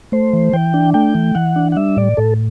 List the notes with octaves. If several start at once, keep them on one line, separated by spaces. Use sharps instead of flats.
A3 C5
E3
E3 G5
D4
A3 G5
E3
E3 F#5
D4
F#5
G3 E5
A2 D5
A2 A4